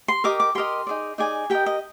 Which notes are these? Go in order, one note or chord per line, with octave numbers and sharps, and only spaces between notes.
C6
G4 A#4 D#5 D6
D6
G4 A#4 D#5 C6
D#4 G#4 D5
D#4 G#4 D5 G#5
G4 A#4 D#5 G5
D#5